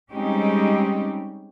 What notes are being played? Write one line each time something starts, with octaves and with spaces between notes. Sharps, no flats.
G3 G#3 C4 C#4 D#4 G4